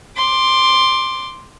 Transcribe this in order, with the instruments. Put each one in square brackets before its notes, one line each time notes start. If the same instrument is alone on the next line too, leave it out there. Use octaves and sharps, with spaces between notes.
[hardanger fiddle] C6 D6